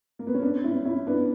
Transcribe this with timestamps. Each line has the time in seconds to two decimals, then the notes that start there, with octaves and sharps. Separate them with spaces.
0.19 A#3
0.27 B3
0.34 C#4
0.42 B3 D4
0.64 C#4 E4
0.85 C#4 E4
1.07 B3 D4